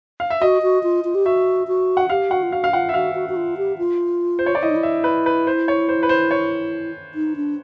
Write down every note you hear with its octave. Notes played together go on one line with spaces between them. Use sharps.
F5
E5
F#4 D#5
F#4
F4
F4
G4
F#4 E5
F#4
F#5
G4 F5
F#4 F#5
F4
F#4 F5
F5
F4 F#5
E5
F#4 F5
F#4
F#4
F4
G4
F4
C5
C#5
D5
E4 D#5
D#4
E4
E5
B4
B4
C5
C#5
C5
B4
C5
C#5
D#4
D4